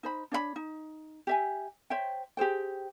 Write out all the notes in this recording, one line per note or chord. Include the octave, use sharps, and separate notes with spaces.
D#4 C5 B5
D4 C#5 E5 B5
D#4
G4 E5 G#5
C5 C#5 E5 G5
G4 G#4 C5 G5